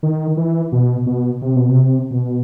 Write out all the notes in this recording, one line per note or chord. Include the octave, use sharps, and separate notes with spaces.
D#3
E3
B2
B2
C3
B2
C3
B2